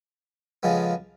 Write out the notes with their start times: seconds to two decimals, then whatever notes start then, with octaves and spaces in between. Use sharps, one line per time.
0.63 F2 C#3 F3 G#3 B3